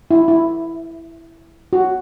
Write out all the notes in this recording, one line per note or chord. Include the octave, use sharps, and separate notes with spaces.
E4
E4
F#4